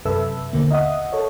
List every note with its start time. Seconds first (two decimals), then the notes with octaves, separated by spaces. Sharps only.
0.05 F#2 C3 A4 B4 E5 E6
0.53 D#2 B2 D3 A#3
0.71 D#5 E5 F#5 D#6
1.12 A4 C#5